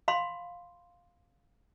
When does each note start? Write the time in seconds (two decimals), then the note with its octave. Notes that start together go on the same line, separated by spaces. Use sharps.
0.08 F5 B5 C6